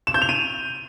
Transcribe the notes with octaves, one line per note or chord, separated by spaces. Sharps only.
E7
G6
F7
D#7